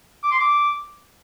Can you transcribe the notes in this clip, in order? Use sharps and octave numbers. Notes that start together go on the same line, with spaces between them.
D6
C6
D6